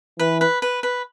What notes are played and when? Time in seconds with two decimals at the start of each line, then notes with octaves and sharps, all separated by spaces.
0.19 E3 B4
0.41 B4
0.62 B4
0.83 B4